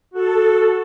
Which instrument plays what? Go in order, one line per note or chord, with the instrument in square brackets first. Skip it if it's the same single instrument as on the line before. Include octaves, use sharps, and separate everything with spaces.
[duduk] F#4 [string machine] A4